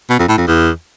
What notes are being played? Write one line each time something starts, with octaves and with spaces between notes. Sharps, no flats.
B2
F2
A2
F2
E2